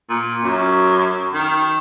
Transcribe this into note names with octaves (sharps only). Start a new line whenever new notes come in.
A#2
F#2
D#3